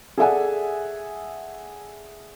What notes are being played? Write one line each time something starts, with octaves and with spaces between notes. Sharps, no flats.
G#4 A4 D5 E5 F#5 G#5